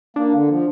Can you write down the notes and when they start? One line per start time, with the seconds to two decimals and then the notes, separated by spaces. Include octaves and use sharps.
0.16 A#3 D4
0.32 D3
0.49 F3